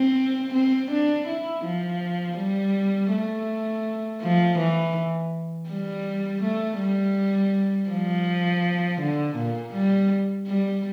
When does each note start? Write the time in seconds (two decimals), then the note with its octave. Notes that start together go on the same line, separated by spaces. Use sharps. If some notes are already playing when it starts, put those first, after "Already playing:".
Already playing: C4
0.54 C4
0.91 D4
1.27 E4
1.65 F3
2.37 G3
3.11 A3
4.22 F3
4.58 E3
5.69 G3
6.42 A3
6.79 G3
7.90 F3
9.01 D3
9.37 A#2
9.74 G3
10.47 G3